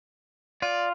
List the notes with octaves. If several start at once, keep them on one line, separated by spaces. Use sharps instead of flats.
F4 D5